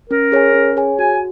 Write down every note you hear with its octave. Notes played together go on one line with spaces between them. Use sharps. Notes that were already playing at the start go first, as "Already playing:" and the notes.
C#4 A#4
G#4 C#5 G#5
C#4
G#4 C#5 G#5
F#4 G#5